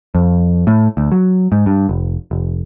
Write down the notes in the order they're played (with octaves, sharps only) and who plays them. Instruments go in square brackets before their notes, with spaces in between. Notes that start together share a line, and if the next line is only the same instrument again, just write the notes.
[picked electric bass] F2
A2
D2
F#3
G#2
G2
F1
F1